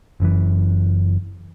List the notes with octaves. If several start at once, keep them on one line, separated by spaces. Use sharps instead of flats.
F#1 F#2 E3